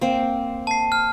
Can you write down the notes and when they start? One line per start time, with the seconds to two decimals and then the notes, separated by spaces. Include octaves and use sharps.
0.01 A#3 C4
0.67 A5 C7
0.92 F6